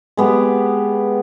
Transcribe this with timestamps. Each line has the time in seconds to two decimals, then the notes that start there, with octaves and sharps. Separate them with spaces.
0.17 G#3 B3 G4